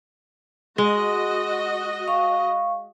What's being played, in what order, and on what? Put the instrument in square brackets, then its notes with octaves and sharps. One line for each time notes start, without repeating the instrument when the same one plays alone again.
[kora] G#3 [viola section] F#4 D#5
[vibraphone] F5 C#6